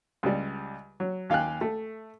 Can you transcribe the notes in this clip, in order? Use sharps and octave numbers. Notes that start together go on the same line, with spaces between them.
C#2 G3
F#3
D#2 F5 G5 G#5 F#6
A3